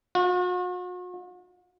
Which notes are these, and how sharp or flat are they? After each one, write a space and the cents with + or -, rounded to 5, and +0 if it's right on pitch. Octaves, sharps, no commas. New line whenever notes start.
F#4 -45